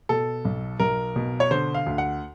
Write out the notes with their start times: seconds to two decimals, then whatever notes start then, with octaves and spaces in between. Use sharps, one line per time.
0.09 B2 A4
0.45 B1
0.80 B1 A#4
1.16 B2
1.40 C#5
1.51 D3 C5
1.74 F5
1.86 D2
1.98 F#5